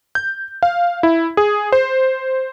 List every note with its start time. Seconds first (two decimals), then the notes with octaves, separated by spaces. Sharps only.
0.15 G6
0.63 F5
1.03 E4
1.37 G#4
1.72 C5